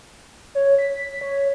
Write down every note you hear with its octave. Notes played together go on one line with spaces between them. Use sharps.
C#5
B6
C#5